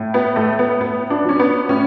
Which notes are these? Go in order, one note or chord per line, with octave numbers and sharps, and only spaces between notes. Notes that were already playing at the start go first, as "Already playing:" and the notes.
Already playing: A2
B3
A2 A3
B3
A2 B3
D4
F#3 C#4
B3
A2 C#4